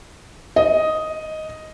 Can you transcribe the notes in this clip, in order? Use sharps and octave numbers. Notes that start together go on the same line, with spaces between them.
D#5